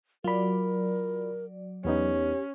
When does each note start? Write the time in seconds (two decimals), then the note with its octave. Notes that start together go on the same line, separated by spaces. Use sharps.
0.24 F#3 F4 A#4 D5 B5
1.85 E2 B3 C#4 D#4 G4